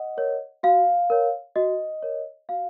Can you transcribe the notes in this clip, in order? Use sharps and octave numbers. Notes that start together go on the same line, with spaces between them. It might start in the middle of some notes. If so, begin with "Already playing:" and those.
Already playing: D#5 F#5
A#4 C#5
F#4 F5
A#4 C#5
F#4 D#5
A#4 C#5
F#4 F5